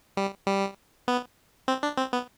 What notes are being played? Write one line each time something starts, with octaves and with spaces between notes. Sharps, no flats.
G3
G3
B3
C4
D4
C4
B3